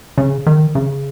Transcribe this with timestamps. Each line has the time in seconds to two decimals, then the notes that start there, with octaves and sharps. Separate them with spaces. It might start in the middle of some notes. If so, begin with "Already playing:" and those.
0.18 C#3
0.46 D#3
0.75 C#3